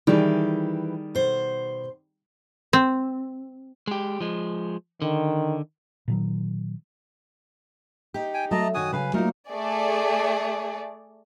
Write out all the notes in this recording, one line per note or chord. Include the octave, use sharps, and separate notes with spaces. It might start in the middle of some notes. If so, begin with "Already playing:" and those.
D#3 E3 G3 G4 G#4
B2 C5
C4
G#3 G4
F3 G#3
D3 D#3
A#2 D#3 F#3
D#4 G4
G5 G#5
F#3 A3 D#5 A5 A#5
F#2 D#3 F#4 G#5 D#6
C#3 B4 F5 G#5
F#3 A3 A#3 D#4 F4 A#4
A3 G#4 D5